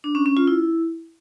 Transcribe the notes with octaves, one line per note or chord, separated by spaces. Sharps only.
D4
C#4
C#4
F4
E4